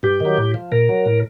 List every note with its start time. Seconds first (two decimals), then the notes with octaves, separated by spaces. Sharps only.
0.03 G2 G4
0.20 D#3 F#3
0.37 A2
0.54 F3
0.72 A#2 A#4
0.89 F#3
1.06 A2